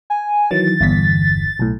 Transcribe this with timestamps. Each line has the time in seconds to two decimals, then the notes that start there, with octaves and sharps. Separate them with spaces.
0.10 G#5
0.51 D#3 E3 F#3 A6
0.81 G1 E2 B6
1.59 B1 A2